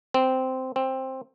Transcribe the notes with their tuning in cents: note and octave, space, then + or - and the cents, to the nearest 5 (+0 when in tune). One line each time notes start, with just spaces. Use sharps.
C4 -10
C4 +10